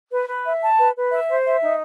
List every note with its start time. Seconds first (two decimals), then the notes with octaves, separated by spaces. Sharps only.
0.11 B4
0.27 B4
0.45 E5
0.62 A5
0.78 B4
0.95 B4
1.11 E5
1.29 C5
1.46 E5
1.62 D#4